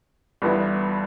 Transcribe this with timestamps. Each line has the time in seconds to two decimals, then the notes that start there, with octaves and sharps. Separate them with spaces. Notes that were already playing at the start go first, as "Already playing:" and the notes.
0.42 G1 G2 E3 B3 E4